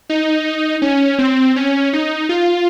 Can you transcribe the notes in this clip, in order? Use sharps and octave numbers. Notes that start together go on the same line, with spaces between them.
D#4
C#4
C4
C#4
D#4
F4